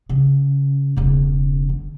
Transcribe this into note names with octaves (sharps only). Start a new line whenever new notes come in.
C#3
E1 C#3
D3